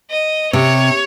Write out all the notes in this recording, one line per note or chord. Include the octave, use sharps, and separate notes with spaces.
D#5
C3 C#5